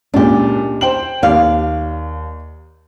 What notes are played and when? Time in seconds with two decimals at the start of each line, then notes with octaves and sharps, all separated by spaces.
0.14 C#2 A#2 D4 G4
0.81 C5 G5 F#7
1.23 D#2 D5 F5